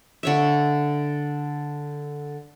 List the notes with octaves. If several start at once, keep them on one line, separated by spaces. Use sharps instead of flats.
D3 C#5 E5